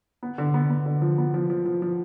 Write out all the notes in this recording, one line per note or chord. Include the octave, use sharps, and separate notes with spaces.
B3
D3
B3
B3
D3
F3
B3
F3
F3
F3
F3